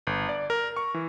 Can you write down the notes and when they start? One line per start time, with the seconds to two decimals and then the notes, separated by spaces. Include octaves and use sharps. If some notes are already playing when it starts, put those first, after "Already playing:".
0.07 G1
0.29 D5
0.50 A#4
0.77 C#6
0.94 E3